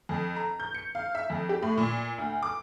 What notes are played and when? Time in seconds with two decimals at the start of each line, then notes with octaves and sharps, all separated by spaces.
0.09 F2
0.36 A#5
0.60 G6
0.74 C#7
0.95 F5
1.15 E5
1.30 F2
1.49 G4
1.62 A2
1.78 A#2
2.18 D2
2.43 D6